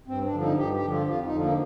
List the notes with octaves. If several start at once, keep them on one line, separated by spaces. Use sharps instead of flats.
G2 C4
D4
D3 F3
D#4
G2 G4
G4
D3 F3
F4
F2 F4
D#4
D3 F3
A#3